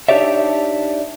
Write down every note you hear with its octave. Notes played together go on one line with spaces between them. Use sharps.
D4 D#4 G4 C#5 D5 E5